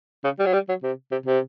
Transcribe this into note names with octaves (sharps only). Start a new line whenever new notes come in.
C#3
G3
F#3
G3
F#3
C3
C3
C3